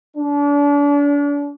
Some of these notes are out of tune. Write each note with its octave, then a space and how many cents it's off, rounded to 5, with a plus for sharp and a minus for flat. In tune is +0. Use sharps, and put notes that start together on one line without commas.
D4 -35